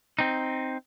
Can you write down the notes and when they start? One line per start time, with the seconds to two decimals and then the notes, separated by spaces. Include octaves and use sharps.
0.19 C4 D#4